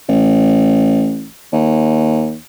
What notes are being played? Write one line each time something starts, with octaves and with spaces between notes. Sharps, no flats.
A1
D#2